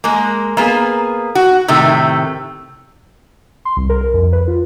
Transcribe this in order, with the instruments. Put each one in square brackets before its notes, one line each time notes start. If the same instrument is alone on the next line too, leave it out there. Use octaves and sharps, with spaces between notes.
[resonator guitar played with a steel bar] G#3 A#3
A#3 B3 G#4
F#4
A2 C3 D#3 A3
[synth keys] C6
C2
A#4
A#4
F2
B4
F4